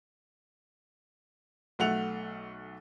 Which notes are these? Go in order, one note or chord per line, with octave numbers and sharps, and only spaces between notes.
B1 A3 F#5 F7